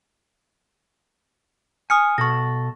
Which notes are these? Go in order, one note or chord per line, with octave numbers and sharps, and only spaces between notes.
G#5 D#6 F6 C#7
B2 A4 C#6 A#6